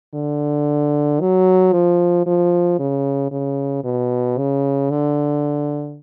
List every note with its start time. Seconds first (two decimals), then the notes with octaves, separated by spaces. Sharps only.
0.15 D3
1.20 F#3
1.72 F3
2.26 F3
2.79 C#3
3.31 C#3
3.84 B2
4.38 C#3
4.90 D3